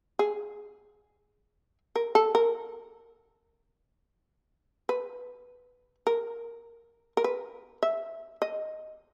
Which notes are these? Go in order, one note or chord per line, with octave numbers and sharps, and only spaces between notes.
G#4
A#4
A4
A#4
B4
A#4
A#4
B4
E5
D#5